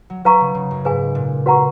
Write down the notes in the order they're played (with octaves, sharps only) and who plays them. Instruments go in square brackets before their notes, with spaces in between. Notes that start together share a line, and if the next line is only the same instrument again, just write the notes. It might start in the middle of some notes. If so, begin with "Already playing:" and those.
[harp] F#3
[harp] F#3 [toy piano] B4 F5 A#5 C#6
[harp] C#3
C#3
F#2
[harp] G#2 [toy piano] G#4 B4 F5 G#5
[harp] A#2
[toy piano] F#4 B4 F#5 A#5 C#6